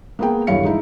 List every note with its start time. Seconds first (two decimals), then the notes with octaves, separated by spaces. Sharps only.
0.19 A#3 B3 G#4 A#4 G5
0.47 D#1 G2 E3 C#5 F5 C#7
0.63 G#3 D#4 E4